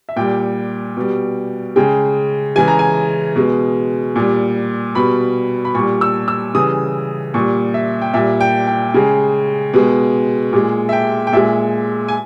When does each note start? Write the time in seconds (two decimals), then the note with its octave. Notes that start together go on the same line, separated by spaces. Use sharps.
0.09 E5
0.16 A#2 G3 G5
0.97 B2 G3
1.76 C#3 G#3 G5
2.56 C#3 E3 G#3 G#5
2.68 A#5
2.79 G#5
3.36 B2 G#3
4.16 A#2 G3
4.95 B2 G3 B5
5.65 B5
5.74 A#2 G3 C#6
6.01 E6
6.28 E6
6.55 C#3 E3 G3 D#6
7.34 A#2 G3 C#6
7.74 E5
8.02 G5
8.14 A#2 G3 E5
8.41 G5
8.67 G5
8.94 C#3 G#3
9.74 B2 G#3
10.53 A#2 G#3
10.89 E5
10.93 G5
11.27 G5
11.33 A#2 G#3 E5
12.08 G#5